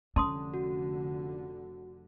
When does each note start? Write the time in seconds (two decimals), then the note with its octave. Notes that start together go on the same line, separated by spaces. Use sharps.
0.16 F1 D3 C#4 A5 C6 D#6
0.54 F#4